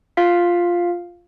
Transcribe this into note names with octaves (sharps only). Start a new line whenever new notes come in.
F4 F5 B6